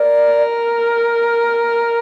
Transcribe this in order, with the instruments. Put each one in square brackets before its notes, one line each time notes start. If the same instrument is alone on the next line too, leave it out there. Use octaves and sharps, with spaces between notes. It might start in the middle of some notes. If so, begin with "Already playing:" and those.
Already playing: [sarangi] A#4 [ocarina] D5